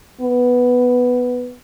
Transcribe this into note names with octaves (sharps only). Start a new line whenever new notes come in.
B3